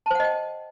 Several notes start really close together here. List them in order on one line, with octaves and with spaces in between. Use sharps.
A5 C5 F#5 D#5 G5